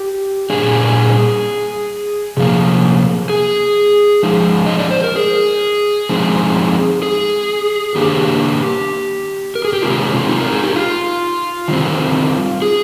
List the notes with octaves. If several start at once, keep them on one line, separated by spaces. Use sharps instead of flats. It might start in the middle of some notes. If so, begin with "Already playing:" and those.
Already playing: G4
A#2 G3 D4 G#4
C3 F3 A#3
G#4
F3 G#3 D#4
D#5
D5
C5
A#4
G#4
F3 G#3 C4 D#4
G#4
D#3 A#3 D4 G4
A#4
G#4
G4
C3 D#3 G#3 C4 F4
F4
D#4
A#4
G#4
G4
F4
D#3 G3 C4
G#4